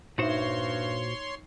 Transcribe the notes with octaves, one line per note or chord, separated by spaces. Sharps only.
G2 A#2 D#4 F#4 C5 C#5 E5 C6